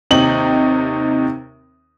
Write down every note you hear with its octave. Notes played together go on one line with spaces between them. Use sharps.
D#2 C3 D#4 F#7